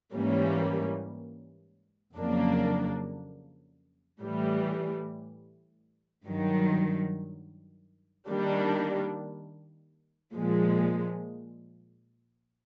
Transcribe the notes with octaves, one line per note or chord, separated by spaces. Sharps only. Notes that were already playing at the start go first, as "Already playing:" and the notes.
G#2 E3 G3 A#3 C#4
F2 C#3 F#3 A#3 D4
A2 E3 G3
G2 D#3 F#3
D#3 G3 A#3 D4
A#2 F3 G#3